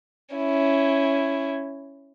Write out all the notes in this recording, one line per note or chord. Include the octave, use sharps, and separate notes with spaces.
C#4 E4